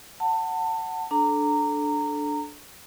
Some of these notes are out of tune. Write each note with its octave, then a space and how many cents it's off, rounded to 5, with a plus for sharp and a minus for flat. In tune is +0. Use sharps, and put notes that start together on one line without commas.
F#5 +0 A5 +30
D4 +0 A4 -20 A#5 -20